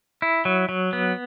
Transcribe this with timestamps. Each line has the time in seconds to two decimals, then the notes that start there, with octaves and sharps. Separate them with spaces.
0.22 E4
0.45 F#3
0.69 F#3
0.93 B3